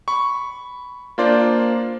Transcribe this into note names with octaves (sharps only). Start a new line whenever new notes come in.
B5 C#6
A#3 D4 F4 C5 D5